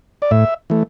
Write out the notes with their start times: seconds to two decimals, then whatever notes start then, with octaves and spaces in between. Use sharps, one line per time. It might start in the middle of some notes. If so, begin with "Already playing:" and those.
0.22 D5
0.31 A2 E5
0.70 E3 A3